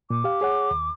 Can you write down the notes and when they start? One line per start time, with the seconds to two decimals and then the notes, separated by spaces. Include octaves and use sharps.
0.10 A#2 D6
0.24 G4 F5
0.41 G#4 C#5 F#5
0.71 D#2